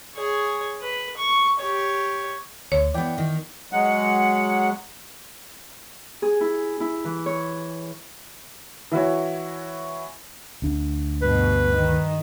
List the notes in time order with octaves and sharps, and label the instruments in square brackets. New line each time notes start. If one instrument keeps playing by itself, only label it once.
[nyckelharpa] G#4 C#5
B4
C#6
G4 C#5
[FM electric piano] D2 [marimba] C#5
[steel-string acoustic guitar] E3 B3 [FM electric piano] D5 G5
[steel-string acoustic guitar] D#3
[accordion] F#3 G#3 F#5
[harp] G#4
E4
E4
E3
C#5
[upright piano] E3 E4 F#4 C#5
[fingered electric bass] D2 D4
[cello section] G2 B2 [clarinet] B4
[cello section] D#3